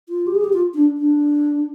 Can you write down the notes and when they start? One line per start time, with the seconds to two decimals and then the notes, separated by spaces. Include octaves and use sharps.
0.09 F4
0.27 G4
0.35 G#4
0.44 G4
0.53 F4
0.74 D4
0.98 D4